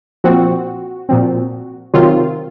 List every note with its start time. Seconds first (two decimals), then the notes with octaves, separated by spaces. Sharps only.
0.24 A#2 F3 C4 F#4
1.09 A#2 F3 C4
1.94 C3 D#3 F#3 C4 F4